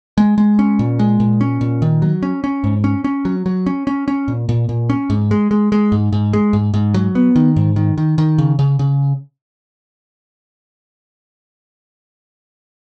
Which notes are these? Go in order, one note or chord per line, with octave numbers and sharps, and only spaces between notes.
G#3
G#3
C#4
A#2
G#3
A#2
C#4
A#2
D#3
F#3
C#4
C#4
G#2
C#4
C#4
F#3
F#3
C#4
C#4
C#4
A#2
A#2
A#2
C#4
G#2
G#3
G#3
G#3
G#2
G#2
G#3
G#2
G#2
F#3
B3
D#3
G#2
D#3
D#3
D#3
C#3
C#3
C#3